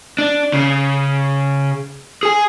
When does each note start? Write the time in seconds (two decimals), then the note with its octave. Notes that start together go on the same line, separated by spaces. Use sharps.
0.19 D4
0.54 C#3
2.23 G#4 G#5